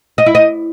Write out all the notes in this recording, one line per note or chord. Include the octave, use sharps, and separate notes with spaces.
D#5
E4
D#5